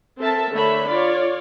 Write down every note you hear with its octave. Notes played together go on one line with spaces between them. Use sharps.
C4 A4 A#4 E5 A5
D3 A3 C#5 E5 B5
F4 C#5 D5